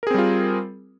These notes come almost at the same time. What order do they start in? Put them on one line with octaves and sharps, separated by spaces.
A#4 G#4 C4 G3 F4